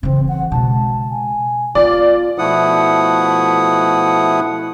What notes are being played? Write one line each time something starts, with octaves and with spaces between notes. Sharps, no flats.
C#3 E3 C4
F#5
B2 G#3 A5
G#5
B3 F4 D5
B2 F3 A3 E4 F#5 D#6